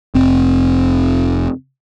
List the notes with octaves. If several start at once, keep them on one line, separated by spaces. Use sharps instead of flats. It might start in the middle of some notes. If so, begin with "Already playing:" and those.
F1 C4